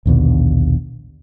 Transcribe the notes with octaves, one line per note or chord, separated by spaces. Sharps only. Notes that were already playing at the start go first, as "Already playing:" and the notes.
A#1 D#2 B2 D3